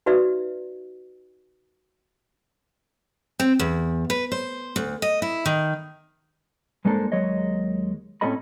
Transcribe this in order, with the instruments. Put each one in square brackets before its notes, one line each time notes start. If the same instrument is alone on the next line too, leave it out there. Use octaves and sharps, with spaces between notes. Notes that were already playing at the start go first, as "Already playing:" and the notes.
[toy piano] D#4 F#4 B4 D5 E5
[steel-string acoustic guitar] C4
E2
B4
C5
D2
D#5
E4
D#3
[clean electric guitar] G2 G#3 A#3 D4 A4 C5
D#2 F#3 G#3 C#5 D#5
A2 C4 C#4 A4 D#5 B5